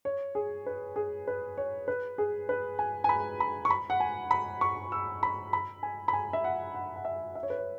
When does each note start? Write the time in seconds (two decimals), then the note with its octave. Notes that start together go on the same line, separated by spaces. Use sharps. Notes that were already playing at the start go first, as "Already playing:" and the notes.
0.05 C#5
0.35 G#4
0.66 B4
0.96 G#4
1.27 B4
1.58 C#5
1.88 B4
2.18 G#4
2.49 B4
2.79 G#5
3.04 G#5
3.09 B5
3.40 B5
3.65 C#6
3.70 B5
3.90 F#5
4.00 G#5
4.31 B5
4.61 C#6
4.92 E6
5.23 B5
5.53 B5
5.83 G#5
6.08 B5
6.13 G#5
6.33 E5
6.44 F#5
6.74 F#5
6.96 F#5
7.05 E5
7.35 E5
7.43 C#5
7.50 B4
7.58 C#5